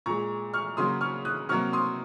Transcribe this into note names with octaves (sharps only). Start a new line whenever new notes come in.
A#2 G#3 A#5 C#6
C#6 F6
C#3 F#3 A#3 C6 D#6
C#6 F6
D#6 F#6
C3 F#3 A#3 C#6 F6
C6 D#6